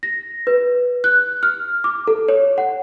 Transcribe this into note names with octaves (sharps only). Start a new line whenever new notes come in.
A#6
B4
F#6
F6
D6
A4
C#5
F#5